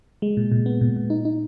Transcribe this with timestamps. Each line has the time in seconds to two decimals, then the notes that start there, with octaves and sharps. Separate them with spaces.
0.22 G#3
0.37 A#2
0.51 A#2
0.66 B3
0.81 A#2
0.96 A#2
1.10 D#4
1.25 D#4